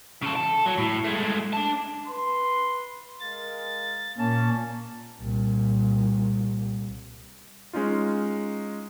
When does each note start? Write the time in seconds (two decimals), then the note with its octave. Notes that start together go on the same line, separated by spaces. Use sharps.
0.22 C#3 A4
0.36 A4
0.66 F#3
0.78 A2
1.05 G#3 A3
1.53 D4 A5
2.07 B4 C6
3.20 G#3 A#4 F5 A6
4.18 A#2 A#3 C#4 A5
5.20 C2 A#2
7.73 G#3 C#4 D#4 F4